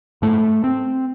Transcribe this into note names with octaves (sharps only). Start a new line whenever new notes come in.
G#2 A3
C4